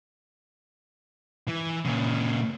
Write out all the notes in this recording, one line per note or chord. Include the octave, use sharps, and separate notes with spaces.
E3
A#2 C#3